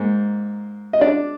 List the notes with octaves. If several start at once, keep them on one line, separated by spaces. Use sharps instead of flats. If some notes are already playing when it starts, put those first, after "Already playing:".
Already playing: G#2 A#3
D#5
D4 D5